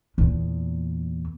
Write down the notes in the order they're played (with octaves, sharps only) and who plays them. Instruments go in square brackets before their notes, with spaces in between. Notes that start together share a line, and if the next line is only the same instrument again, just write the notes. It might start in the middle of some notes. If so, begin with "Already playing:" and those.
[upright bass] E2 A#2